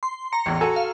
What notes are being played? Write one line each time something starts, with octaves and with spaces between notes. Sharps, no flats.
C6
A#5 C#7
A1 E2
F#4 A4 G#5
F5